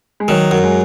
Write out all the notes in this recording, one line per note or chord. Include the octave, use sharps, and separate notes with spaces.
G#3
D#3 F#3
F#2
G#3